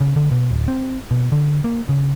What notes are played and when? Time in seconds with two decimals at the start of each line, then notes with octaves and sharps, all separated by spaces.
0.01 C#3
0.16 D3
0.31 B2
0.51 D1
0.68 C4
1.11 B2
1.32 D3
1.64 A#3
1.89 C#3